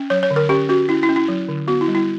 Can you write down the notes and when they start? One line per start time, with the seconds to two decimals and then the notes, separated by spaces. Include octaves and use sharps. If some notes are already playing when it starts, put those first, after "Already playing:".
Already playing: C#4
0.10 F#3 C#5
0.23 C#5
0.31 D3
0.36 A#4
0.49 C#4 G4
0.69 C#4 F#4
0.89 C#4 E4
1.03 E4
1.09 C#4
1.16 E4
1.28 F#3
1.48 D3
1.67 B3 F#4
1.81 E4
1.88 G3
1.95 E4